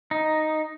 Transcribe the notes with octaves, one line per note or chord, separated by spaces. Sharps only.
D#4